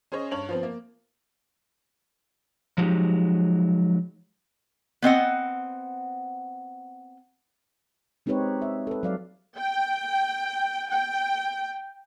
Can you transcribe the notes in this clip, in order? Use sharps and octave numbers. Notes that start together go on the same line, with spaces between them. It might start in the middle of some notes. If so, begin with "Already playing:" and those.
C#4 G#4 C5 C#5 D#5
G2 C#5 F7 F#7
F3 B3 C4
A#3
F3 F#3 G#3 D#4 G4
B3 C4 D#5 F#5
G#3 C4 D#4 G4 B4 C#5
E5
A4 B4
F#3 D5 F5
G5
G5